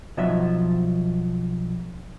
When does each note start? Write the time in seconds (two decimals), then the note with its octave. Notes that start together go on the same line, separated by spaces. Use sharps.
0.17 B1 F3 F#3 D#5 E5